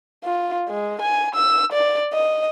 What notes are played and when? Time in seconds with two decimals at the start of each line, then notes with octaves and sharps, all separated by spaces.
0.24 F4
0.69 G#3
1.02 G#5
1.35 E6
1.73 D5
2.13 D#5